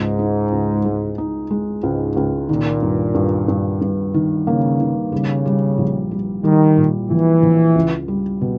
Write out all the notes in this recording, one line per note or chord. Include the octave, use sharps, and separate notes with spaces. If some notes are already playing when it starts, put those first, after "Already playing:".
Already playing: C#2 G#2
D#4
C#2
G#3
D#4
G#3
C#2 G#2
C#2
A#2 D#3
G2
G2
G2
G2
D#3
C#3 A#3
D#3
C#3 G3
G3
A#1
G3
D#3 G3
A#2
A#1 E3
A#1
C#2
G3
B2